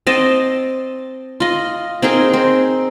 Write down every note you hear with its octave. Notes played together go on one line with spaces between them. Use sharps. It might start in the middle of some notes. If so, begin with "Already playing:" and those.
C4 D#5 A5
F4 D#5
C4 D#4 G#4 A#4
C4